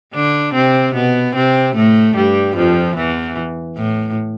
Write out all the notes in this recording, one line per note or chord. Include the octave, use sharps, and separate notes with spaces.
D3 D4
C3 C4
B2 B3
C3 C4
A2 A3
G2 G3
F2 F3
E2 E3
A2